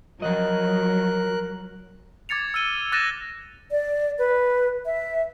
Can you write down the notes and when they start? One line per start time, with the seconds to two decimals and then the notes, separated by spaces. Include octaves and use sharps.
0.22 F3 F#3 A#4 D#5 F#6
2.29 D6 G#6 A6 C#7 F7
2.54 E6 F6 D#7 G7
2.92 D6 F#6 A6 A#6 D#7 E7
3.71 D5
4.19 B4
4.86 E5